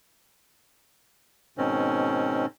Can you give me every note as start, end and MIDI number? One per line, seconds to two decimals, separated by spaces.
1.58 2.46 44
1.58 2.46 47
1.58 2.46 51
1.58 2.46 60
1.58 2.46 61